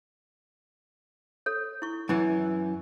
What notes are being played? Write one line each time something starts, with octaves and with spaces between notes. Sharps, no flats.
A4 C#5
E4 C#6
F#2 E3 E4